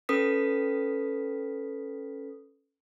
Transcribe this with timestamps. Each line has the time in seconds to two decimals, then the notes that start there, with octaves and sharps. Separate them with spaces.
0.09 C#4 A4 B4 D#6 B6